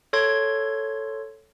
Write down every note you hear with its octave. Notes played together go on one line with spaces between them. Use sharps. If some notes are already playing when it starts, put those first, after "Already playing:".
A4 C#5 C6 G#6